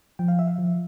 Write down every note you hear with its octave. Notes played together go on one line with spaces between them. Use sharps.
F3 G5
F5
E5
F5
F3